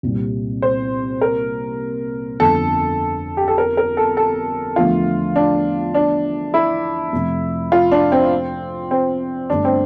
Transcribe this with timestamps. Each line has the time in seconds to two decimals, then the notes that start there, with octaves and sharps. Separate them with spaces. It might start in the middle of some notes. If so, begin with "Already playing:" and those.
0.03 C2 A#2 G3 C4
0.62 C5
1.21 A#4
2.39 G1 F2 D3 A4
3.37 G4
3.48 A4
3.58 A#4
3.77 A#4
3.97 A4
4.17 A4
4.76 E2 D3 F3 A3 F4
5.36 D4
5.95 D4
6.54 E4
7.13 F2 C3 F3 A3
7.72 F4
7.92 D4
8.12 C4
8.91 C4
9.50 G1 G2 D3 A3 D4
9.65 C4